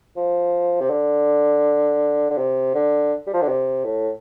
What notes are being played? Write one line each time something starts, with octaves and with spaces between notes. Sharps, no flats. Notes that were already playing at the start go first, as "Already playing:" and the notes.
F3
C3
D3
D3
C3
D3
G3
F3
D3
C3
A2